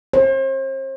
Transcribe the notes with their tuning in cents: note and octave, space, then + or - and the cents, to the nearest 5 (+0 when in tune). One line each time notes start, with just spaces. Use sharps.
C5 +40